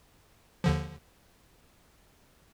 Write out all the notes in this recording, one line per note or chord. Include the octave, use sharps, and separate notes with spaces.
D#2 D3 F3